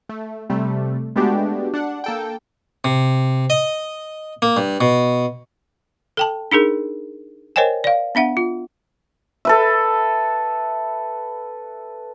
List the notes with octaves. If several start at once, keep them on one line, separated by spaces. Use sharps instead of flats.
A3
C3 G3 A3
G#3 A3 B3 D4 F#4 G4
D4 F#5
A#3 A4 G5
C3
D#5
A#3
G2
B2
A4 G5 A5
D4 D#4 G#4 A#4
A#4 C5 C#5 D#5 G5 G#5
D5 F5
B3 D4 E5 F#5
F4
A4 B4 E5